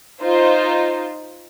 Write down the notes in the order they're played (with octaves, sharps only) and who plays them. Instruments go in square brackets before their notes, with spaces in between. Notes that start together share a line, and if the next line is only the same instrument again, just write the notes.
[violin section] D#4 F4 C5